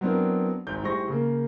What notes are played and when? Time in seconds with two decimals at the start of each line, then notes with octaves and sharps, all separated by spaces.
0.01 F#3 B3 C4 D4 E4 A#4
0.67 G#1 G#2 G6
0.82 A2 G3 G#4 C5 C#6 A#6
1.08 C#3 A#3